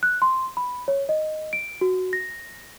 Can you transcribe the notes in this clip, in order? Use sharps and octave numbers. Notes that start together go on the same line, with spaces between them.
F#6
C6
B5
C#5
D#5
D7
F#4
A#6